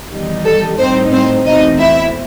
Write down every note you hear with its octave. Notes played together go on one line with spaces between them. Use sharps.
E2 D#3 G3 D#4
A4
A2 G3 C4 D#4 C5
C4 C5
E2 B2 A3 C4 D#4 D#5
E4 E5